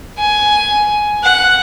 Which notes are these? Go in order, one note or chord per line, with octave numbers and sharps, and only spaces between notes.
G#5
F#5